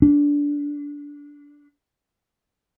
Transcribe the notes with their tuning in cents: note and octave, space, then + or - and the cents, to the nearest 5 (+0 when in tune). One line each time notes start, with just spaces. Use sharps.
D4 -20